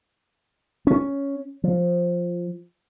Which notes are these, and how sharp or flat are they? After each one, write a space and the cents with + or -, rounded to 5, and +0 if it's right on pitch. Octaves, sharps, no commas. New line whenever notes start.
C#4 +5
F3 +5